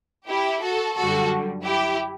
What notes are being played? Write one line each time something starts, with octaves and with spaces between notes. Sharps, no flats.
E4 G4
F#4 A4
F#2 D3 G3 F#4 A4
E4 G4